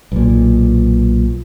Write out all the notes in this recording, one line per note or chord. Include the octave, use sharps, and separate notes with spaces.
B1 A#2